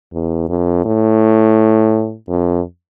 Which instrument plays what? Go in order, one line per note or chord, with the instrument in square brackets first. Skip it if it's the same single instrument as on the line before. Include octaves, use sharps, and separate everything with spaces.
[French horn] E2
F2
A2
F2